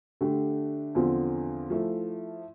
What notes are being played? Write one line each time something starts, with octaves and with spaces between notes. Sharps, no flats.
D3 A3 D4 G4
E2 D3 F3 C4 F4
F3 A3 E4